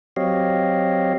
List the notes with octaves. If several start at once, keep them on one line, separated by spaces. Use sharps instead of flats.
F#3 C4 G4 C#5 D#5 F5